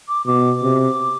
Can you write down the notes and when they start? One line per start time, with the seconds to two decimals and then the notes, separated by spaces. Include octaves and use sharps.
0.08 D6
0.26 B2 D6
0.63 C3